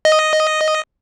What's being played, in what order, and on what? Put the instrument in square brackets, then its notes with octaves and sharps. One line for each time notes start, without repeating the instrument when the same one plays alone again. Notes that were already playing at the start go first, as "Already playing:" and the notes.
[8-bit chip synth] D#5